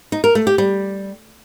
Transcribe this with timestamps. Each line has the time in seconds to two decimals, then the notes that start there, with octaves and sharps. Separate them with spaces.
0.12 D#4
0.24 A#4
0.35 A3
0.47 G4
0.58 G3